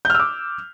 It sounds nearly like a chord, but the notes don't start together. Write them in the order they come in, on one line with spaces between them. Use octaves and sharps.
G6 F6 E6 D6